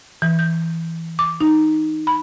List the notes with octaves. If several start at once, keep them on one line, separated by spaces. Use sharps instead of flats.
E3
G6
D6
D#4
B5